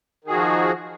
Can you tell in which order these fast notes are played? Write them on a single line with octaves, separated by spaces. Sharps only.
D#3 G#4 F#4 F3